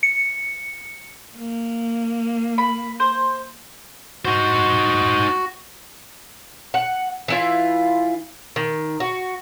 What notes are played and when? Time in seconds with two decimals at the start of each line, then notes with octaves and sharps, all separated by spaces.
0.03 C#7
1.36 A#3
2.58 B5
3.00 C5
4.25 D#4 F#4 C5
6.74 F#5
7.28 E3 E4 F4
8.56 D#3
9.00 F#4